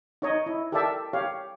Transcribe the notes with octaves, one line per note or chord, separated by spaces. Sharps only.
D#4 C#5 D#5
E4
G4 A4 A#4 D5 E5 A5
G4 C#5 F5